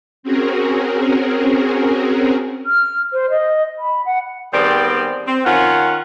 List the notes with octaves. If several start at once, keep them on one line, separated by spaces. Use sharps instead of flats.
C4 C#4 F#4 G#4 A#4
F6
C5
D#5
B5
F#5
D#3 G3 B3 C4 G#4 D5
C4
D#3 C#4 F4 F#5